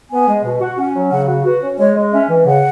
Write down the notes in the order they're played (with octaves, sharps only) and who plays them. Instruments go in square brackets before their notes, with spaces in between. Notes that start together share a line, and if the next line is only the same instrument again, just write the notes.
[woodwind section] B3 [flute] G#5
[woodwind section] G#3
B2
F#4
[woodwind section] C#4 [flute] F#5
[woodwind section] F#3
[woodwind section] C#3 [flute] F#5
[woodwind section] F#4
[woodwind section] F#4 [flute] B4
[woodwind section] C#4
[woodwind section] G#3 [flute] C#5
[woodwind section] G#3
[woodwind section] C#4 [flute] E5
[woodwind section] E3
[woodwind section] C#3 [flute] F#5